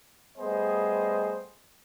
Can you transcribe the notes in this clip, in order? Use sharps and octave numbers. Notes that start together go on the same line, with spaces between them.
G3 A3 B3 G#4 C5 D#5